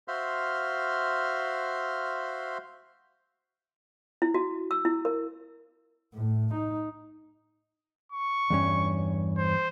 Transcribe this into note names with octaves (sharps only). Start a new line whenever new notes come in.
F#4 C5 E5 F5 C6 F6
E4
F#4
E6
E4
A#4
A2
D#4
C#6
E2 G2 C#4
C5